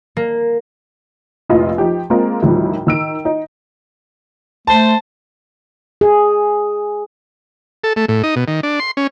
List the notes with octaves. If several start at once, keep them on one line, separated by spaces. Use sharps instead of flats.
A#3
F1 A#1 E4 F4 D#5
F3 D#4 G4
G#3 A#3 C4 F4 G#4 A#4
D2 A2 D#3 F3 G3
D#3 E6 D7
D#4
A3 C5 A5
G#4
A4
A3
A2
D#4
B2
D#3
D4
C6
C#4